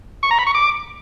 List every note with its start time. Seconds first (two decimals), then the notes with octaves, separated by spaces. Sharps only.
0.23 C#6
0.31 A#5
0.39 B5
0.47 C#6
0.54 D6